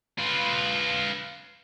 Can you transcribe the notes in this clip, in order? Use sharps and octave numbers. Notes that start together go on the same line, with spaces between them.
F4 B4